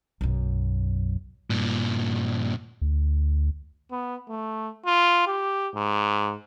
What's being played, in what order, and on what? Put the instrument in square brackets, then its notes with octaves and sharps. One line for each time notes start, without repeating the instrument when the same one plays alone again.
[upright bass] B1 F#2
[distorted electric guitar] G2 A#2
[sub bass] D2
[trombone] B3
A3
F4
G4
G#2